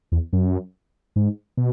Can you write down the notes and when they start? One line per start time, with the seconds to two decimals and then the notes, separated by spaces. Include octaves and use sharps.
0.12 E2
0.33 F#2
1.16 G#2
1.57 B2